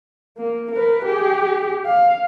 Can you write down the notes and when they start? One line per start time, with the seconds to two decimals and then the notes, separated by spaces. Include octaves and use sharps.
0.38 A#3
0.72 A#4 B4
1.05 G4 G#4
1.86 F5